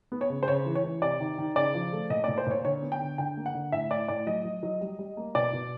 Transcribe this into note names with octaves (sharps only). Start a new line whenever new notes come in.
B3
C#5
C#3
C5
C#3 C#5
E3
C#5
E3
C3 D5
D#3
D#3
C#3 D5
F3
A3
A#2 D#5
A#2 D5
C5
A#2 C#5
D3 C#5
B3
G5
D3
D3 G5
A#3
F#5
D3
A2 E5
A2 D5
A2 D5
F#3 D#5
F#3
F#3
G3
G3
A#3
B2 D5
B2